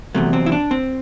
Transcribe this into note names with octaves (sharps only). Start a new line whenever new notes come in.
E2 C3 F#3 A3
C4
E4
D4
C4